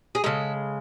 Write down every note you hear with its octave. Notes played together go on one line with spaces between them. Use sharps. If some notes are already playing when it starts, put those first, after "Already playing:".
G#4
C#3 G#3 A4